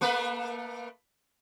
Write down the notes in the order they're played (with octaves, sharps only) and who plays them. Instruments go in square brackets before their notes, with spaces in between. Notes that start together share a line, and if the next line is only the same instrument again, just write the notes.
[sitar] A3 A#3 B4